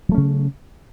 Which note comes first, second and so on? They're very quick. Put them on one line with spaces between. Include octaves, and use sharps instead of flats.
F#3 A3 C#4 C#3